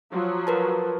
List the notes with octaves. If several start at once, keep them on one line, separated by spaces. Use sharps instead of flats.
F3 F#3
A#4 B4 A5